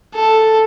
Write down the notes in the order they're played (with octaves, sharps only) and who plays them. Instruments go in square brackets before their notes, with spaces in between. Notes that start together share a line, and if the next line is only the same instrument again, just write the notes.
[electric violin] A4